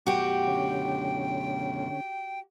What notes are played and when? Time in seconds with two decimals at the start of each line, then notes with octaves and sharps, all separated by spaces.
0.06 F#2 B2 F#4 G4 G5
0.47 D3 C#4